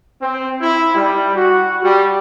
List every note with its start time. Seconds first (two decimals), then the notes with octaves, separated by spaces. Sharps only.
0.22 C4
0.61 E4
0.95 G3
1.35 F#4
1.83 G3